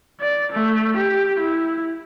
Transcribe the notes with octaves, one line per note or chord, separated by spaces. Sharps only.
D5
A3
G4
E4